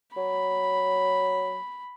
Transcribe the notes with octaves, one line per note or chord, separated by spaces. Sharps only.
F#3 B5